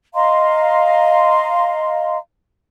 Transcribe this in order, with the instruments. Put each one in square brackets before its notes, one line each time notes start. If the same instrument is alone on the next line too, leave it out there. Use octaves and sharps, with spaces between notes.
[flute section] D#5 F5 A#5 C6